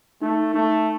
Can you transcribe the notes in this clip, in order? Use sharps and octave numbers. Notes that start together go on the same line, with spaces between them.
A3 D#4
A3 D#4